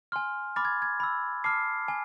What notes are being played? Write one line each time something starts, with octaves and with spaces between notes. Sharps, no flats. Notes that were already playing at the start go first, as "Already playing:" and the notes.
G#5 C6 F6
B5 D6 F6 A6
G#6
G#6
B5 E6
A5 D6 F6 C7
G#5